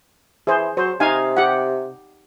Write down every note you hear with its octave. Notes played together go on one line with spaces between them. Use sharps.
E3 G#4 C5
F#3 C5
C3 D#4 F5 G#5
G4 F#5